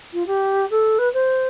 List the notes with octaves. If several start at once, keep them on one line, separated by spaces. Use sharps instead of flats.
F4
G4
A4
B4
C5